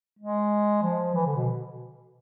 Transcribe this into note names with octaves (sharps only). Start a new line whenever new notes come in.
G#3
F3
E3
D3
B2